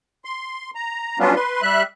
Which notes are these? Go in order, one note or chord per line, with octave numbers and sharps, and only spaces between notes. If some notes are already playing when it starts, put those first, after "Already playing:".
C6
A#5
F#3 G3 B3 C#4 D4 F4
B4 C6
G3 E5 F#6